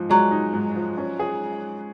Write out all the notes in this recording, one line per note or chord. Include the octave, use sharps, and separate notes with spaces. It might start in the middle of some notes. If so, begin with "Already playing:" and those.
Already playing: G#2 F3
F#3 G#3
D#4
G#2
F3
C#4
G#4